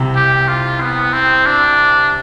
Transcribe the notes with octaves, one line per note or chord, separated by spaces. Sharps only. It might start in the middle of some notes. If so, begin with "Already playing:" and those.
Already playing: C2 C3
G4
F4
B3
C4
D4